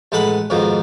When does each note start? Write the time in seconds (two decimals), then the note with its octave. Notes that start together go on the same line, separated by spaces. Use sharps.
0.12 A1 G#3 A4 B4 F#5 B5
0.50 F2 G#2 B2 D#3 F3